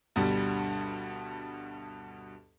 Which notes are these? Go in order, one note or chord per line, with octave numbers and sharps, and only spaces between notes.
D2 G2 B2 G3